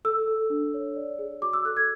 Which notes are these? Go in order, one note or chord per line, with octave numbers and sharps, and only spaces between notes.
A4 E6
A4
D4
C#5
D5
G#4
F#4 D6
E6
A4 F#6
G#6